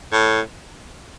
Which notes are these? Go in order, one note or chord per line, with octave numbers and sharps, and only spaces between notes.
A2